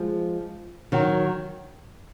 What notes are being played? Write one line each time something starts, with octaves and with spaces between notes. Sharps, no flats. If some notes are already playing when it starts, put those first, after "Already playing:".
Already playing: F3 G#3
D#3 F#3